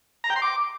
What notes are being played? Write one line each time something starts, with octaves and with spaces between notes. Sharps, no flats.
A#5
G5
C6
D6